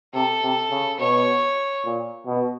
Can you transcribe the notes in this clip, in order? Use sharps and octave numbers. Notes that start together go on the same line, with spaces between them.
C3 A4
C3
C#3
B2 C#5
A#2
B2